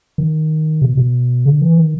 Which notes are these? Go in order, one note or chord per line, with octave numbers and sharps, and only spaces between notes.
D#3
B2
B2
D3
E3
D#3